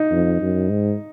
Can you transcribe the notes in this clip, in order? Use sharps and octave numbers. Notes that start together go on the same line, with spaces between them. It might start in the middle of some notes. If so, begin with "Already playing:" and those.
Already playing: D#4
F2
F#2
G#2